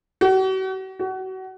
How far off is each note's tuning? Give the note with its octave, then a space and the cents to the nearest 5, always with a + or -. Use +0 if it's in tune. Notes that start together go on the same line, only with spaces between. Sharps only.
F#4 +40
F#4 +30